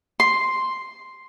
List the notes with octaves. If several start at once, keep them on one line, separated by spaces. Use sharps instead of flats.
C6